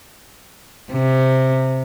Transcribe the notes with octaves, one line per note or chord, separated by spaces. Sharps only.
C3